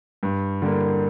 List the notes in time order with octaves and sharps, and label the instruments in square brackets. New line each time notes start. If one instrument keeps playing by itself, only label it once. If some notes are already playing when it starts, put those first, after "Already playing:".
[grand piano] G2
D3 G3 A#3